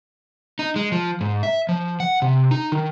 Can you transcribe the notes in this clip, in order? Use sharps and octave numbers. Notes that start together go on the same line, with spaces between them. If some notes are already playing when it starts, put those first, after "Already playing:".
D#4
G#3
F3
G#2
E5
F3
F#5
C3
D#4
D#3